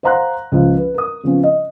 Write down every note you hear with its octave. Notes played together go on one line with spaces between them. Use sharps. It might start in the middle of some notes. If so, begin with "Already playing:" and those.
C5 F5 F#5 A#5 C6 F#6
C#2 F3
B4
A#4 D#6
C#3 F3 B3 C#4
D#5